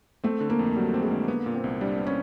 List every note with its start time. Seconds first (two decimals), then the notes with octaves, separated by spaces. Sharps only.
0.24 A3 C4
0.41 D3
0.50 A#3
0.59 F2
0.75 F#3 G3
0.94 C4
1.03 G#3
1.11 D3
1.28 A#3 B3
1.46 A#2
1.54 C4
1.64 C2
1.81 G3 D4
1.98 B3
2.07 C#4